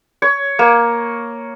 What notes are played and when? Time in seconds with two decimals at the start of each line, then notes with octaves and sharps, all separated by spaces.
0.22 C#5
0.59 A#3